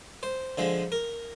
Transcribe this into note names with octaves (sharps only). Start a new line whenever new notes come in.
C5
D3 F3 G#3
A#4